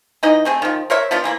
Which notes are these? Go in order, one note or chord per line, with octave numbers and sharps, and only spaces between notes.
E3 D#4 D#5
A3 C4 G#4
D#3 F3
A#4 C5 C#5 E5
F3 B3 D4 F4
E3 A#3 E4